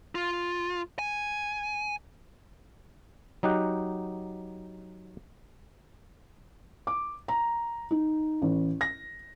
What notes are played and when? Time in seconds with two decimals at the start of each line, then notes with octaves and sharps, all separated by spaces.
0.15 F4
0.99 G#5
3.43 F#3 D#4 G4 F#5
6.87 D6
7.28 A#5
7.91 D#4
8.42 A1
8.81 A#6